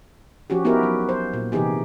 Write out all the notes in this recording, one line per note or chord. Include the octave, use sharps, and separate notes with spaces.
F3 C#4 F#4 G4
B3 D#4 E4 F#4 G4 A#4
F#3
C5
A#2
C3 E3 D#4 G4 G#4